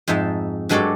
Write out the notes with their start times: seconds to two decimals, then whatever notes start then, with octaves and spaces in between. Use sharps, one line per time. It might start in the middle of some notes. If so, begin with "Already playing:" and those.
0.08 F2 G#2 D#4 E5 A5
0.69 G2 F#3 G#3 A4 C#5 D5